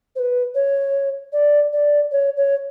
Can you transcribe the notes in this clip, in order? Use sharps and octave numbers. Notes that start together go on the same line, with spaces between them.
C5
B4
C#5
D5
D5
C#5
C#5